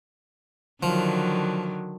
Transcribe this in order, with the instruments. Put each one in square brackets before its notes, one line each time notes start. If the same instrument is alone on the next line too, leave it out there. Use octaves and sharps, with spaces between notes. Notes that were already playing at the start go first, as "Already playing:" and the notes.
[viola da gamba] D3 D#3 F#3 [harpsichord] F3